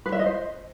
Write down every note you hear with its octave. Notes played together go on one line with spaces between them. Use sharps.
B4
E5
D#5
C5